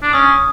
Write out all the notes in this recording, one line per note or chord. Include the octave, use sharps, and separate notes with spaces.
D4
C#4 D#6